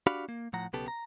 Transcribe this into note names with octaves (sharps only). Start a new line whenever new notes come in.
D4 F#4 G4 F5 B5
A#3
A2 F3 F#5 A#5
B1 C#3 B3 G4 A4
A#5